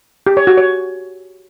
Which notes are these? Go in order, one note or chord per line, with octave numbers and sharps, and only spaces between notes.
G4
C#5
F#4
C#5